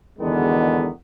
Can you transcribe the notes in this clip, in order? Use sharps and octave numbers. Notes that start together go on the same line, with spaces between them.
E2 B2 D3 D#3 G#3 B3